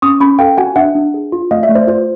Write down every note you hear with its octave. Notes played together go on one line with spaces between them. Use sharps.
C#4 C#6 D#6
C#4 B5 C#6
A4 F5 G5
F#4 F#5 G#5
D4 E5 F#5
D4
G#4
F4
A3 D#5 F5
D5 E5
A3
C5 D5
F4 C5 D5